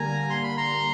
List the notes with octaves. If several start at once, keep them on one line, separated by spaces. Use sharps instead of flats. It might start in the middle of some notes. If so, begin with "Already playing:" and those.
Already playing: D3 G3 A#3 G#5 A#5
C6
B5
A#5 C6